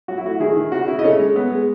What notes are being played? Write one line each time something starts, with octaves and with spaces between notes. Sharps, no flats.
F#3 F#4
E4
A3 F#4
D#3 E4 G#4
D#3
C#3 F#4
C#3 E4
D#5
C#3 A4 C#5
G#3
B3
G#3